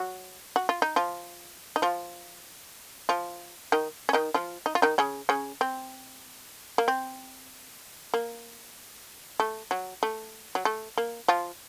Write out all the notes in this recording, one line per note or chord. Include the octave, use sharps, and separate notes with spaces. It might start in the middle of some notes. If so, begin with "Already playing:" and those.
Already playing: F#3 F#4
F#4
F4
D#4
F3 F4
D#4
F3 F4
F3 F4
D#3 D#4
C#4
D#3 D#4
F3 F4
D#4
F4
D#3 D#4
C#3 C#4
C#3 C#4
C4
A#3
C4
A#3
A3
F#3
A3
F#3
A3
A#3
F3 F4